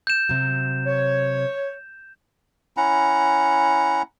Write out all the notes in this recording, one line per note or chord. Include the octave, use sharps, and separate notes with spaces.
G6 E7
C3 F#3
C#5
C#4 E4 F#5 A#5